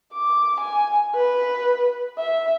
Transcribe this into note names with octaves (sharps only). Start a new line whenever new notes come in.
D6
G#5
B4
E5